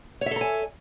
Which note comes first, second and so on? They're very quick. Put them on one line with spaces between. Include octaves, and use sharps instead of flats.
C#5 E5 A4 A#5 G#5